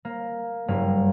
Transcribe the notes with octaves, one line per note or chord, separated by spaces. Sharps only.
A#3
F#1 G2 A#3